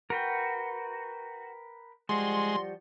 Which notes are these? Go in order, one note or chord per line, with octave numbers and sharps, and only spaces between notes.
F#4 A#4 B4 G5
F3 G3 G#3 F#4 C6